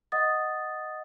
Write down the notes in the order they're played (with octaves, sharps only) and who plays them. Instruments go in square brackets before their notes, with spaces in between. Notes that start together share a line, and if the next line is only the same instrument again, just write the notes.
[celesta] D#5 F#5 D#6 A6